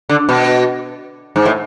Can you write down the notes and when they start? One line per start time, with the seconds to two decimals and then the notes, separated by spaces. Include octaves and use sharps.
0.09 D3
0.29 B2
1.36 G#2
1.46 A2